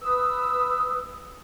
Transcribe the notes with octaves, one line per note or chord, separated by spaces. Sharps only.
B4 D#6 E6